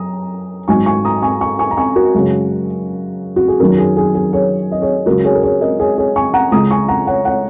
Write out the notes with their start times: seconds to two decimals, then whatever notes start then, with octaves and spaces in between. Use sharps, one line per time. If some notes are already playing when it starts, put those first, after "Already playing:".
Already playing: F#2 A#5 D#6
0.68 G#1 G#2 F#3 D#4 G#5 C#6
0.86 G#5 C#6
1.05 A#5 D#6
1.22 G#5 C#6
1.41 G#5 C#6
1.59 G#5 C#6
1.71 A#5
1.77 G#5 C#6
1.96 F#4 A#4
2.14 F#2 C#3 G#3 C#4
3.36 F#4
3.48 G#4
3.60 F#2 D#3 F#3 C#4 F#4 A#4
3.78 G#4
3.97 G#4
4.15 G#4
4.33 G#4 C#5
4.72 D#5
4.82 G#4 C#5
5.06 C#2 C#3 F#3 F#4 A#4
5.24 G#4 C#5
5.35 A#4
5.43 G#4 C#5
5.61 A#4 D#5
5.79 G#4 C#5
5.98 G#4 C#5
6.16 G#5 C#6
6.34 F#5 A#5
6.52 C#2 C#3 G#3 A#5 D#6
6.71 G#5 C#6
6.88 F#5 A#5
7.07 C#5 F#5
7.25 C#5 F#5